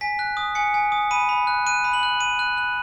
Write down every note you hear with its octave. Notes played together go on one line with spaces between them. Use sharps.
G#5 B6
F#6
D#6
G#5 C#7
G#5
D#6
B5 D#7
B5
F#6
F#6 D#7
B5
F#7
F#6
F#6 D#7
F#6
F#6